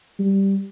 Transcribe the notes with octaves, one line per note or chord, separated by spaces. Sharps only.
G3